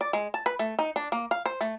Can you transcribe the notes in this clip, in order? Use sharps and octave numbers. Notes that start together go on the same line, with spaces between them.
D5
G#3
A5
B4
A3
D#4
D4
A#3
F5
C5
A3